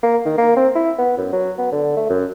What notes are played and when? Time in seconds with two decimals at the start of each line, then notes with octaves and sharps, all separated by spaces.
0.03 A#3
0.25 D#3
0.38 A#3
0.56 C4
0.75 E4
0.98 B3
1.17 F#2
1.32 F#3
1.58 B3
1.72 D3
1.97 A3
2.09 F#2